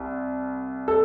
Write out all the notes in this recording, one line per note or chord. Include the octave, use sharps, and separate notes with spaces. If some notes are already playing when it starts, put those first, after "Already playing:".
Already playing: C2
A4